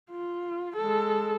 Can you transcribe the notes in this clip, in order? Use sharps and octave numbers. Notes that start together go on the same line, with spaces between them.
F4
G#3 A4